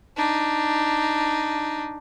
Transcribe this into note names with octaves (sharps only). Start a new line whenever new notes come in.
D4 D#4